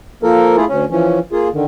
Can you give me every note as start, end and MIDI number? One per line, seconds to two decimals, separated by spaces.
0.23 0.56 53
0.23 0.56 58
0.23 0.56 69
0.23 0.56 70
0.57 0.65 57
0.57 0.65 64
0.57 0.65 65
0.57 0.65 68
0.69 0.85 38
0.69 0.85 61
0.90 1.19 52
0.90 1.19 53
0.90 1.19 61
1.32 1.49 58
1.32 1.49 65
1.32 1.49 68
1.53 1.65 50
1.53 1.65 51